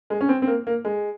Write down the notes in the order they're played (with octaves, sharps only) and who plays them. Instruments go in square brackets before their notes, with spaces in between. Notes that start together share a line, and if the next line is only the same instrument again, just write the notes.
[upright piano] G#3
C#4
C4
C4
A#3
A#3
G#3